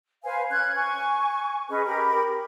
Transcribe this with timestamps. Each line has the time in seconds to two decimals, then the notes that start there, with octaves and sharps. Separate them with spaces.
0.24 B4 C5 F5 G#5
0.51 C#4 F#6 G#6
0.76 G#5 C#6
1.69 C#4 G#4 B4 D#5
1.85 G4 A#4 B5